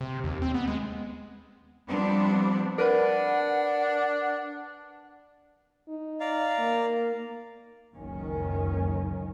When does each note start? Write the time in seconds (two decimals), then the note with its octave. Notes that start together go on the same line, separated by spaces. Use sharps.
0.01 C3
0.24 D#2
0.42 C4
0.54 B3
0.68 G#3
1.89 F3 G3 B3 C4 D4
2.78 D4 A#4 B4 F#5 B5
5.88 D#4
6.20 D5 F5 A#5
6.59 A#3
7.95 F#1 C#2 F#2 D#3 C#4